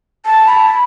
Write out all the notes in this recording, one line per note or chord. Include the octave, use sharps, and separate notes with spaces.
A5
B5